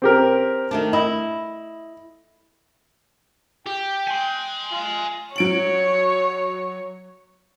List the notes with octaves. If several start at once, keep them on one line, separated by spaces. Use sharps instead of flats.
C4 G4 A#4
D#3 A3 D4
E4 D#5
G4 G5
G#5 C6
F4
F#3 C#5 D7 F#7